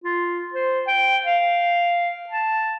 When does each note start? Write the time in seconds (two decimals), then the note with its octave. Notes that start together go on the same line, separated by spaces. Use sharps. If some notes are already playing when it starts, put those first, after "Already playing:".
0.04 F4
0.53 C5
0.87 G5
1.25 F5
2.29 A5